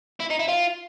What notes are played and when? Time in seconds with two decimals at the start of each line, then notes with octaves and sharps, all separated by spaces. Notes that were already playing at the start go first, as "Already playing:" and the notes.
0.20 E4
0.30 D#4
0.40 E4
0.49 F4